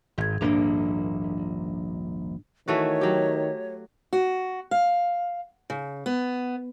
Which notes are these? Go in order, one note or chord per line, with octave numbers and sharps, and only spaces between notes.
G#1 G#2 G#6
D#1 A#1 A#3 D4
D#3 E3 A3 F#4 C#5
F#3 G4
F#4
F5
C#3
B3